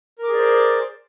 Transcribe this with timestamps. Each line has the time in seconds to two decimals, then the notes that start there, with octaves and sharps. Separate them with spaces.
0.18 A#4
0.23 D6
0.28 G#4
0.33 D5
0.38 C5